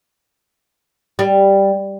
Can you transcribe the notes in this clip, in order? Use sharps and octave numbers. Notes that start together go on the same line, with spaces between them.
G3